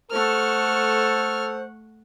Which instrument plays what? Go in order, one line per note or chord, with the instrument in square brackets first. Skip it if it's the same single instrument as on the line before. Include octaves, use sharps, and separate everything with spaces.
[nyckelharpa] A3 F#5 [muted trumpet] A4 [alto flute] C5 [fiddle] C#6 F6